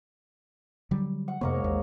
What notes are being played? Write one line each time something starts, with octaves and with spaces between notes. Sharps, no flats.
D3 F#3 G3
F#5
F2 G#2 C3 A#3 B3 C#5
A1 D#2